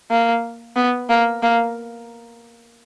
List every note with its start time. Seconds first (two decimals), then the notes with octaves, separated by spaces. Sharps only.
0.11 A#3
0.76 B3
1.09 A#3
1.42 A#3